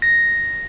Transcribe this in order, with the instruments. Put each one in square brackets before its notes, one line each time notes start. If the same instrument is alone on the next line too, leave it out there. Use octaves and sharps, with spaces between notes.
[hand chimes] A#6